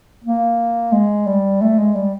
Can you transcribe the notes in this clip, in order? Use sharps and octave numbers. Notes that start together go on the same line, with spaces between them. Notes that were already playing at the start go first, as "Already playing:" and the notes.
A#3
G#3
G3
A3
G#3
G3